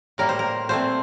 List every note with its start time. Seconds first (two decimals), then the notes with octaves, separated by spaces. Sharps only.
0.18 A2 G3 A#3 A#4
0.29 C5
0.39 A#4
0.69 A#2 A3 C4 C5